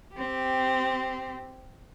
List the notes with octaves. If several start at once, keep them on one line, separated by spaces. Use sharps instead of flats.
C4 G4